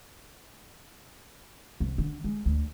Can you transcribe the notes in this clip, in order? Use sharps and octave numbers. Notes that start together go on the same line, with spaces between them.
C2
D3
G#3
D2